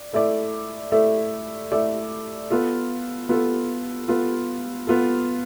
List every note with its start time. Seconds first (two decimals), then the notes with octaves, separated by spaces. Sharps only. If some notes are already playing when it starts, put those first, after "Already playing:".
Already playing: D5
0.13 A3 E4 A4 D5
0.92 A3 E4 A4 D5
1.72 A3 E4 A4 D5
2.51 B3 F4 A4
3.29 B3 F4 A4
4.08 B3 F4 A4
4.87 B3 F4 A4